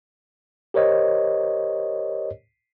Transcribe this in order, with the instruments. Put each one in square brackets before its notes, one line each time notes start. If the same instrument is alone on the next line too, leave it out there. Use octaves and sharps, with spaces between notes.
[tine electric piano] G4 A#4 C5 C#5 D#5